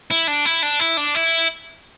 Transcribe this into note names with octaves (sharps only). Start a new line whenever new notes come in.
E4
D4
E4
D4
E4
D4
E4